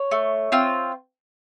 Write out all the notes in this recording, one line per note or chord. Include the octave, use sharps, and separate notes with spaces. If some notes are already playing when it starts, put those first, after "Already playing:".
Already playing: C#5
A3
C4 F4